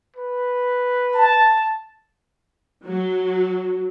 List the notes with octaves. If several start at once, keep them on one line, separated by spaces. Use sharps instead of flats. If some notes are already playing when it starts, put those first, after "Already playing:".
B4
A5
F#3